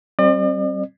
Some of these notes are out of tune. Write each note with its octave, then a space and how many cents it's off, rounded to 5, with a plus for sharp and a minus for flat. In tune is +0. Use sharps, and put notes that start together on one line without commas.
G3 -35 C4 +25 D5 +45